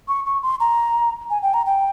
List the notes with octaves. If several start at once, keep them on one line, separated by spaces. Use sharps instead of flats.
C#6
C#6
C6
A#5
G#5
G5
A#5
G5